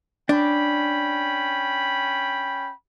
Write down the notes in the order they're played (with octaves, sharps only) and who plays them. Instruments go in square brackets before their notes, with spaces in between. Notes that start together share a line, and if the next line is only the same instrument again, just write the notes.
[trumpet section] C#4 G5 B5 [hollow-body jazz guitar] D4